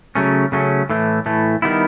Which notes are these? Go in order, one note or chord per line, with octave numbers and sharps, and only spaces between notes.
C#3 F#3 A3 C#4
C#3 F#3 A3 C#4
A2 E3 A3
A2 E3 A3
D#3 G3 B3 E4